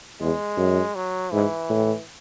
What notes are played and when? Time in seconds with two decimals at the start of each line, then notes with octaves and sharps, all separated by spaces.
0.20 E2 G#3
0.58 F#2
0.95 F#3
1.32 G#2 E3
1.69 A2